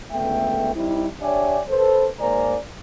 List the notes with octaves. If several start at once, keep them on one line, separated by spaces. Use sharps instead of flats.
C#2 D3 A3 B3 E5 G5
G3 C4 D#4 E4
D4 G4 C#5 D5 E5 G#5
A4 B4 C5
G#2 A#3 C5 D5 G#5 A#5